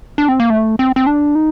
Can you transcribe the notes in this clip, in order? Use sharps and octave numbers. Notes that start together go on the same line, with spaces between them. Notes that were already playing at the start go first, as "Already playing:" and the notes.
D4
C4
A#3
A3
C4
C4
D4
D#4